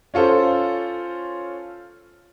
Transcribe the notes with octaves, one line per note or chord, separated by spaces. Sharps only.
C#4 F4 A4 C5